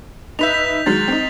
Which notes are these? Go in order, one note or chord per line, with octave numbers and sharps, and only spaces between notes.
D#4 B4 E5 G6 B6 F7
B6
D#3 F#3 G#3 F6 A6
C4 D#4